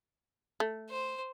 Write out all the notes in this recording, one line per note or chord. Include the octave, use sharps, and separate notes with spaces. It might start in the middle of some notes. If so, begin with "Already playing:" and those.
A3
C5